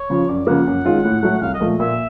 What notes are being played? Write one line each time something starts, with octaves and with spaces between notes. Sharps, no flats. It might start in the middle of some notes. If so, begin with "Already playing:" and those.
Already playing: C#5
C#3 F3
F#2 D5
C#3 F3 A#3 F#5
F#2
D#3 G#3 C#4 F4
A2
F#3 A3
C2 F5
D#5
A#2 F3 A3
A#2 E5